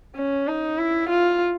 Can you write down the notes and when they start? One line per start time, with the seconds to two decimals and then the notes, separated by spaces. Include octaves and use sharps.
0.15 C#4
0.47 D#4
0.78 E4
1.10 F4